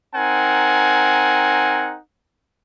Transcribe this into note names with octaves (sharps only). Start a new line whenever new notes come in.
C4 D#4 A#4 F#5 G#5